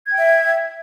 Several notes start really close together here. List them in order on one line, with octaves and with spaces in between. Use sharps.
G#6 G5 E5